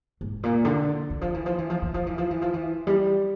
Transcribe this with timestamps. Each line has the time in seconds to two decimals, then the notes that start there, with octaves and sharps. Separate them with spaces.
0.21 G#2
0.43 A#2
0.65 D3
1.10 E3
1.21 F3
1.34 E3
1.46 F3
1.58 E3
1.70 F3
1.82 E3
1.94 F3
2.07 E3
2.18 F3
2.31 E3
2.42 F3
2.54 E3
2.87 G3